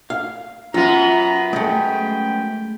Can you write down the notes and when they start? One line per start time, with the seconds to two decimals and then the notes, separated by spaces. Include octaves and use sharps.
0.10 F5
0.74 F#2 B3 F4 A#5
1.53 G#3 A3 G5